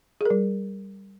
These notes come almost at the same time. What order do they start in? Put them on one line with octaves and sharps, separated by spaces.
G#4 A#4 G3